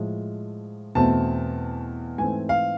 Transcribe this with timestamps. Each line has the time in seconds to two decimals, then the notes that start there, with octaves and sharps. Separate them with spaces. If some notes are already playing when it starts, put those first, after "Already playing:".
Already playing: A2 F3 G#3
0.95 E2 B2 A3 C4 A5
2.18 G#2 E3 A3 C4 G#5
2.49 F5